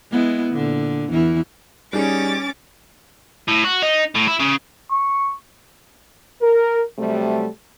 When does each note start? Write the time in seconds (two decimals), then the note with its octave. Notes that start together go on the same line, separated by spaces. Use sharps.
0.11 G#3 B3 E4
0.53 A#2 D3
1.11 E2 E3 E4
1.93 G3 C#4 D#4 G#4 D6 A6
3.48 A2
3.64 F#4
3.82 D#4
4.15 A2
4.28 E4
4.40 C#3
4.92 C#6
6.42 A#4
6.98 C3 F#3 G3 A3